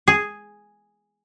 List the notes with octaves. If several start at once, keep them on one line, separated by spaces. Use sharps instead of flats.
G#4